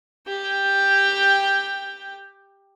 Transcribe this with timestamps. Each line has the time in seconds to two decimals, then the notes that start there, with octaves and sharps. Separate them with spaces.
0.28 G4 G5